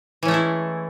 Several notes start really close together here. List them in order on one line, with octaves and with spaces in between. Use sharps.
E3 C#4 A3 G#3 E4